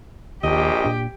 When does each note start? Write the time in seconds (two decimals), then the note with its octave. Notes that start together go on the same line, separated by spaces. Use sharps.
0.44 A#1 D#2 G4 D#5
0.85 A#2 D4